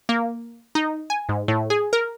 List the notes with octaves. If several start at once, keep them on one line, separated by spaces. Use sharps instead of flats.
A#3
D#4
G#5
G#2
A2
G#4
A#4